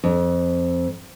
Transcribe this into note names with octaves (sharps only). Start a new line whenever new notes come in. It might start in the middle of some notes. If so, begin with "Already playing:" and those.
F2